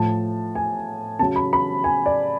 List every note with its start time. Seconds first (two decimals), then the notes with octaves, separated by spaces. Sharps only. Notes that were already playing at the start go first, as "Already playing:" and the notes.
Already playing: A2 F3 A5
0.55 G#5
1.19 C#3 F#3 A5
1.36 B5
1.53 B5
1.84 G#5
2.06 D5